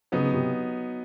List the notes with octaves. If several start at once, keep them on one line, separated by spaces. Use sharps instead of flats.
C#3 F#3 B3 D#4
C3